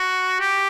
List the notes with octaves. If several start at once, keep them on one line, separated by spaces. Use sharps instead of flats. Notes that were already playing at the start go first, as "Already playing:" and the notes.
Already playing: F#4
G4